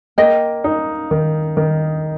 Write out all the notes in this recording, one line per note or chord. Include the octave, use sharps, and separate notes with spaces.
A#3 D#5 G5
D#4
D#3
D#3